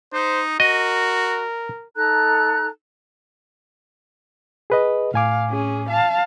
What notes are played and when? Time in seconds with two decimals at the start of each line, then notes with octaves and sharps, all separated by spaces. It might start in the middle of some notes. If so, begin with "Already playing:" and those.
0.13 D#4 C5
0.60 F#4 A#4 D#5
1.95 D#4 A4 A#5 F#6
4.70 G#4 B4 D#5
5.14 A2 F5 G#5 D6
5.49 C#4 G#4
5.89 F5 A5